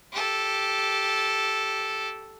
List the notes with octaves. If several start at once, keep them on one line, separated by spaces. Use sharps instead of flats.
G4 A4